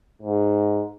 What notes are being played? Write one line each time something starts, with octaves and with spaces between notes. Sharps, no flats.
G#2